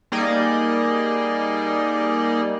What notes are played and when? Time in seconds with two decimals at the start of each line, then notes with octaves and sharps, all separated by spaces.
0.12 G3 A#3 D#4 G#4 D5 D#5